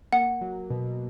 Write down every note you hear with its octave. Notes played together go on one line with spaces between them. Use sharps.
A#3 F#5
F#3
B2